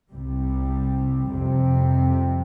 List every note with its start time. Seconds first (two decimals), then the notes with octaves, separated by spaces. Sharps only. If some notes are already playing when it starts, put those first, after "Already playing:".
0.10 C2 C3 G3
1.32 F2 C3 G3 C4